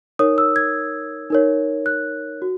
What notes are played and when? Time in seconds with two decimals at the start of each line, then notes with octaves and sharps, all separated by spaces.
0.19 D#4 A#4 C#5 D#6
0.38 E6
0.56 G#6
1.30 D#4 A#4 C#5
1.86 F#6
2.42 F#4